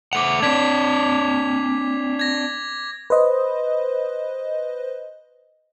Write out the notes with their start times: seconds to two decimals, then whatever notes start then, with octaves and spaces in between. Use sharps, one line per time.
0.13 A3 F#5 D6 F7
0.42 C4 D4 G#6 B6
2.19 G#6 A#6
3.10 B4 C5 D#5